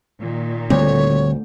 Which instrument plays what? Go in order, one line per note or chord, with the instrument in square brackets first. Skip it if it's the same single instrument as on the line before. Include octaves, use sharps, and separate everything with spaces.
[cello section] A#2 D#3
[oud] D2 [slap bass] D3 G3 C4 [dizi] C#5